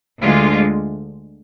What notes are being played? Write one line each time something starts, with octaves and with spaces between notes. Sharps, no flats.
D2 D3 G#3 F4